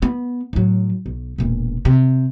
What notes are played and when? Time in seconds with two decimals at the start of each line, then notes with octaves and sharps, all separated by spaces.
0.02 B3
0.53 A2 F#3
1.06 B1
1.38 E1 A#2
1.85 C3